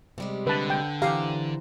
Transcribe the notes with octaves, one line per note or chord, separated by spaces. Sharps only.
C3 G3 G#3
D3 B4 A5
G5
E3 G4 C5 F5 A#5